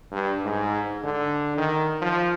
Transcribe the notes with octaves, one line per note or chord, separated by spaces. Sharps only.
G2
G#2
D3
D#3
F3